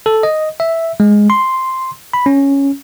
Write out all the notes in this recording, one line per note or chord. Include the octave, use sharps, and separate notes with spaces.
A4
D#5
E5
G#3
C6
B5
C#4